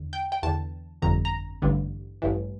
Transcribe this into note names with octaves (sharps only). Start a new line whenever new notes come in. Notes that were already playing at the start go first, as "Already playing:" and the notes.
Already playing: E2 D3
G5
G5
E2 D3 A5
G1 F2 D3 A#5
A#5
A1 G2 D3
A1 G2 E3